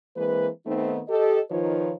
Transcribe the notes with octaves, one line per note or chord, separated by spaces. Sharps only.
E3 G#3 A#3 C4 B4
D#3 A3 B3 C4 D#4
G4 A4 D#5
D#3 F3 D#4 F4 B4 C#5